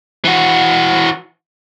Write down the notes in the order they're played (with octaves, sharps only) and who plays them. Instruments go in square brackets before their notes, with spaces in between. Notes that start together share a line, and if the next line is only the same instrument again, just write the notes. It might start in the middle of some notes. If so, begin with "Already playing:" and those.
[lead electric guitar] E3 F#4